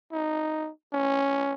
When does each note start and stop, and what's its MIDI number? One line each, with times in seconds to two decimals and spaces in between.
0.12 0.70 63
0.93 1.54 61